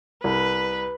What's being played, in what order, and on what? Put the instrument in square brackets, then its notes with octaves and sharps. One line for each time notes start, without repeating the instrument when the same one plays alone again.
[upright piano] C2 [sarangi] B4